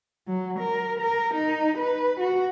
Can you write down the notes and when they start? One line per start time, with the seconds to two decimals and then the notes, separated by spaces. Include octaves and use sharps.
0.28 F#3
0.59 A#4
1.00 A#4
1.34 D#4
1.79 B4
2.20 F#4